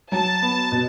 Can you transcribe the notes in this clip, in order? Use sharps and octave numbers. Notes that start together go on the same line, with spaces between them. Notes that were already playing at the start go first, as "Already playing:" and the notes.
F#3 A5
B3
B2